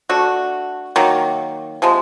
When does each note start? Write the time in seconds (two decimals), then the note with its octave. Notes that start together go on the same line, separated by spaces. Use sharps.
0.09 A3 D4 F#4
0.96 D#3 F#3 A#3
1.82 C3 F3 G#3